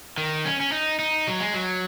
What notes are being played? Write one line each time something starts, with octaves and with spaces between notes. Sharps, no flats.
D#3
C#4
C#4
D#4
D#4
F#3
G#3
F#3